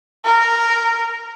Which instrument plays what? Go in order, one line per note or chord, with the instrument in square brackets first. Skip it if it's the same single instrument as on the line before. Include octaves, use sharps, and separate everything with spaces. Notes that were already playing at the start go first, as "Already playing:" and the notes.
[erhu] A#4